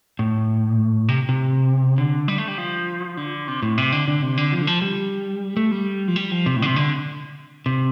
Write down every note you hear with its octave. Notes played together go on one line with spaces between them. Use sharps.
A2
C3
C3
D3
G3
A3
G3
F3
D3
C3
A2
C3
D3
D3
C3
D3
F3
D3
F3
G3
A3
G3
F3
G3
F3
C3
A2
D3
C3
D3
C3